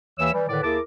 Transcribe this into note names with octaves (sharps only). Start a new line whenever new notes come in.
D#2 E3 C#5 E5 E6
E3 G3
A2 D3 D#3 B4 D5
D#2 E4 G#4 A#4 A5 D6